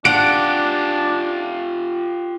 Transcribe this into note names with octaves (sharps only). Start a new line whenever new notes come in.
D4 F4 G4 F#5 D7